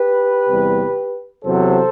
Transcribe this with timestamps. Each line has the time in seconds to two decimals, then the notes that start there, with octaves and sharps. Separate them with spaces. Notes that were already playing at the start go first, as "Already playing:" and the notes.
Already playing: G4 B4
0.48 E2 C3 G3
1.44 E2 C3 F#3 B3 A4 C5